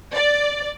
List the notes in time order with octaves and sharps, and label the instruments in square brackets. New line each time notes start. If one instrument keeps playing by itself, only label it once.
[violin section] D5